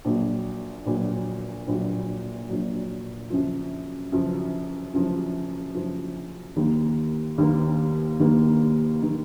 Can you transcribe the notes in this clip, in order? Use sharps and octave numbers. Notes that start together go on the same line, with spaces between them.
A#1 A#2 F#3
A#1 A#2 F#3
A#1 A#2 F#3
A#1 A#2 F#3
F#2 C#3 F3
F#2 C#3 F3
F#2 C#3 F3
F#2 C#3 F3
D#2 D#3 A#3
D#2 D#3 A#3
D#2 D#3 A#3
D#3 A#3